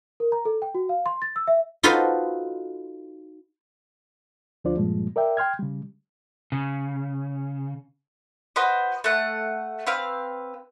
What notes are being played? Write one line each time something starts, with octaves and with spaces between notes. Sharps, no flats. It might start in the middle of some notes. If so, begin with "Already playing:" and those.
A#4
A#5
A4
G5
F#4
F5
C6
A6
E6
E5
D#4 F4 F#4 A4 B4 C5
D2 F3 D4 F4 C5 D5
G2 A#2 F3 G3 G#3
A#4 D5 E5 G5
G5 C6 F6 G#6
C#3 G3
C#3
F#4 B4 C5 D#5
A3 F#5
C4 B4 F5